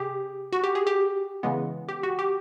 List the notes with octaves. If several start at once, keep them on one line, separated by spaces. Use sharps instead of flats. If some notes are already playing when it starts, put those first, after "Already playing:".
Already playing: C3 G4 G#4
F#4
G4
G#4
G4
C#3 E3 G#3 B3
G4
F#4
G4